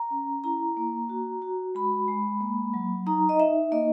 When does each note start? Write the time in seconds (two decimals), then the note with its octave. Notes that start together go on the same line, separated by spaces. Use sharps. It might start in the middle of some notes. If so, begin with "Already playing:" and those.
Already playing: A#5
0.11 C#4
0.44 E4 A#5
0.77 A#3
1.09 F#4
1.42 F#4
1.75 G#3 B5
2.08 G#3
2.41 A#3
2.74 F#3
3.06 D#4 A#5
3.29 D#5
3.40 D#4 E5
3.72 A#3 D#5